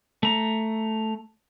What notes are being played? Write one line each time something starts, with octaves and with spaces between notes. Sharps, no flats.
A3 A#5